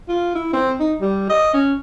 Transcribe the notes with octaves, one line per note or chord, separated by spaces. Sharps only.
F4
E4
C4
D#4
G3
D#5
C#4